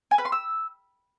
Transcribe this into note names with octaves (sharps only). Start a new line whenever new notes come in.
G#5
B4
C6
E6